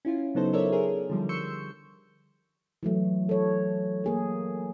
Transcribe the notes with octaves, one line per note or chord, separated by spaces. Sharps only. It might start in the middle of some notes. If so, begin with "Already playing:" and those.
C#4 E4 F4
C#3 F#3 B3 D#4 A4 C5
A4 A#4 C#5 D5 E5
G#4 A#4
D3 F3 G3
C6 C#6 E6 G6 C#7
E3 F#3 A3
A4 C#5
A#3 G#4 A#4